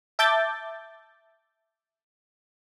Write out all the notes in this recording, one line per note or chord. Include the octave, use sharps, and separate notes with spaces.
E5 A5 D6 G6 A6